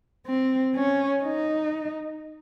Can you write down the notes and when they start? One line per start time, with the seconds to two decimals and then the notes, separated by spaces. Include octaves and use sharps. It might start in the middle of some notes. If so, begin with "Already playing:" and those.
0.27 C4
0.75 C#4
1.23 D#4